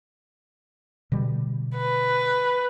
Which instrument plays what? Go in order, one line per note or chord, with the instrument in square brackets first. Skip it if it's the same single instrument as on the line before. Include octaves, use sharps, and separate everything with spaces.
[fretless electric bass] B2 D3 G3
[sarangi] B4